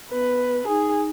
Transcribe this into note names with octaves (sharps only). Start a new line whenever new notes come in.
B3 B4
C#4
D#4 G#4